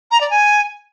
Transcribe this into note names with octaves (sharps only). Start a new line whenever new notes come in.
A#5
D5
G#5